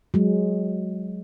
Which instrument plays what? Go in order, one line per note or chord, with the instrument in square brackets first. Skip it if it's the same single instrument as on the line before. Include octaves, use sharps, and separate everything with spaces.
[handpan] F#3 G#3